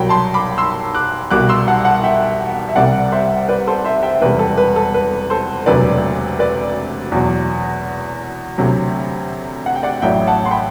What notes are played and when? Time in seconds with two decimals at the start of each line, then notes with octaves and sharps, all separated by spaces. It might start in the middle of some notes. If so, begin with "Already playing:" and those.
Already playing: C2 B2 F#3 G5 B5
0.09 A5 C6
0.34 B5 D6
0.58 C6 E6
0.95 D6 F#6
1.31 C2 B2 G3 D6 F#6
1.49 C6 E6
1.68 F#5 A5
1.85 F#5 A5
2.04 E5 G5
2.69 E5
2.76 C2 C3 G3 D5 F#5
3.12 C5 E5
3.49 B4 D5
3.67 A4 C5
3.85 C5 E5
4.03 E5 G5
4.21 E1 E2 C3 G3 B4
4.39 A4
4.58 B4
4.76 A4
4.94 B4
5.30 A4 C5
5.66 E1 D2 C3 F#3 B4 D5
6.39 B4 D5
7.12 E2 B2 F#3
8.58 D2 C3 F#3
9.66 F#5
9.76 G5
9.83 D5 F#5
10.02 A1 A2 F#3 E5 G5
10.27 F#5 A5
10.45 C6
10.51 G5 B5